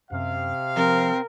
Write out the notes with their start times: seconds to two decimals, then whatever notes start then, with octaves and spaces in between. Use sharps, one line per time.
0.11 F#2 C3 F5
0.76 F3 C4 A#4